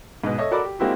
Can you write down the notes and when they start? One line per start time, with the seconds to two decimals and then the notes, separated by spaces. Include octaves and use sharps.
0.24 G#2 B2
0.38 A4 C#5 D#5 E5
0.51 F#4 A4 A#4 D5 B5 D6
0.65 G4
0.79 G#3 A#3 C4 E4 F#4 G4